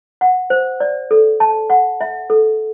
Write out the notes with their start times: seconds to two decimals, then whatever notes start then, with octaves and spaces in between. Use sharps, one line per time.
0.21 F#5
0.50 C5
0.80 D5
1.11 A4
1.40 A5
1.70 F#5
2.01 E5
2.30 A4